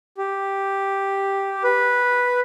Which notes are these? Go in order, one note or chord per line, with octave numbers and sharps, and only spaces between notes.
G4
B4